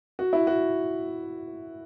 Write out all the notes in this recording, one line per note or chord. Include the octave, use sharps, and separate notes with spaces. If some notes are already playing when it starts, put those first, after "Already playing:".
F#4
E4
F#4